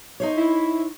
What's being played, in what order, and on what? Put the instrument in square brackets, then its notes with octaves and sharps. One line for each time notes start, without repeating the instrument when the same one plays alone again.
[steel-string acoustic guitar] D#4 C5 C#5
[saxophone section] E4